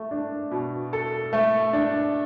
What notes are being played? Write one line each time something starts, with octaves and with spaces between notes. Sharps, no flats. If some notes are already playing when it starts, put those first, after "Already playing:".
Already playing: A3
D4
B2
A4
A3
D4